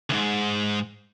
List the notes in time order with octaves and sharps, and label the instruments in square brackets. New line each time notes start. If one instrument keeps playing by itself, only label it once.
[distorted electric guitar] D2 G#2